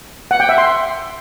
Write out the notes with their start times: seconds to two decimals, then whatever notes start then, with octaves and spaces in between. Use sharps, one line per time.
0.31 F#5
0.40 G5
0.49 E5
0.58 C6